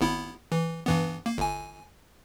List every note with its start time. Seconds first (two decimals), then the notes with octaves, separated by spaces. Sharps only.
0.01 G#1 B3 E4
0.52 E3
0.86 G2 E3 B3
1.26 A#3
1.38 G1 G#5